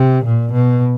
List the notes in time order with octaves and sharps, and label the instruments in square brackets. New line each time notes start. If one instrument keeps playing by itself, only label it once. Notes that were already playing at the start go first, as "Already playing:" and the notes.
Already playing: [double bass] C3
A#2
B2